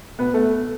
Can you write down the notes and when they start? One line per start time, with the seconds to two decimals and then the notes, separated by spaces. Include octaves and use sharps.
0.19 B2 B3 B4
0.34 A3 A4